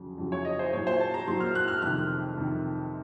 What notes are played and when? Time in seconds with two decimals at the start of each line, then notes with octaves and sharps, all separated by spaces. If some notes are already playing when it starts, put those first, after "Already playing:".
Already playing: F2 C#3 F#3
0.18 F2 C#3 F#3
0.32 C#5
0.45 D#5
0.59 C5
0.73 A#2 F#3 C#5
0.87 C5
1.00 A5
1.14 A#5
1.27 A#2 F#3 C6
1.40 F6
1.55 F#6
1.68 F6
1.82 F2 C3 D#3 F#6
2.36 F2 C3 D#3